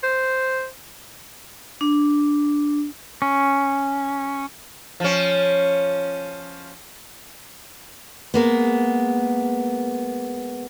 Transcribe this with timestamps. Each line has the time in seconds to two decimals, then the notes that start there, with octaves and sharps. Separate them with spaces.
0.03 C5
1.81 D4
3.22 C#4
5.00 F3 C#4
8.34 G#3 A#3 B3